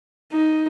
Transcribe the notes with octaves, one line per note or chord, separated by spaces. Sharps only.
D#4